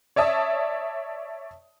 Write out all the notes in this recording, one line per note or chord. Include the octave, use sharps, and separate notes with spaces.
C#5 D5 E5 A5 D#6